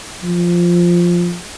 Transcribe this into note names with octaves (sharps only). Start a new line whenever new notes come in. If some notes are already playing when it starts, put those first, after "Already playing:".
F3